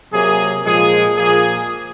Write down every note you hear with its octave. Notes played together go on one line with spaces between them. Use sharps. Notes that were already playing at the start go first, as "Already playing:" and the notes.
C3 F#3 A#3 G#4
A#2 F3 G#3 G#4
A#2 F3 A#3 G#4